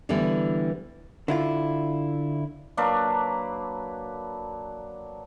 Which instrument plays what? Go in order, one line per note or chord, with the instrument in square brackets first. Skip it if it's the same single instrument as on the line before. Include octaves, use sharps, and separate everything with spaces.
[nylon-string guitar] D3 E3 G3 B3 E4
[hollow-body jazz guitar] D3 E4 F4
[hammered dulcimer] F#3 A#3 D4 B4